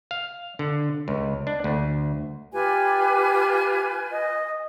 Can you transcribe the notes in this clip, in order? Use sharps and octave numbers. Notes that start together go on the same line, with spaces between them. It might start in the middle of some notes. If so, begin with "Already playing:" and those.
F5
D3
C#2
D4
D2
F4 G4 B4 G#5
D#5